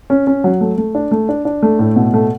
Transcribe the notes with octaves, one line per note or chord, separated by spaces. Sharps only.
C#4
C#4
F#3
A3
A3
D4
A3
D4
D4
A3
A2
B2
A3